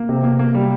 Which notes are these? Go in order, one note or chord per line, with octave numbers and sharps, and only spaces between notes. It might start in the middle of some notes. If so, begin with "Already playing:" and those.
Already playing: A#3
C3
A#3
A#3
G3